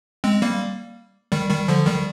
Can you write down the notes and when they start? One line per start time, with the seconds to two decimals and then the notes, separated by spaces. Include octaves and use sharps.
0.24 G#3 C4
0.42 G3 A#3
1.32 D#3 G3
1.50 D#3 G3
1.68 D3 F3
1.86 D#3 G3